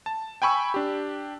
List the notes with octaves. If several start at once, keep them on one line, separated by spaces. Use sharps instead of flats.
A5
G5 G#5 B5 C#6 E6
D4 G4